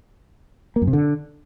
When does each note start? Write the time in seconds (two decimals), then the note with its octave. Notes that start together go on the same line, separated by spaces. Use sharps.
0.76 A#3
0.82 F#2
0.87 C3
0.93 D3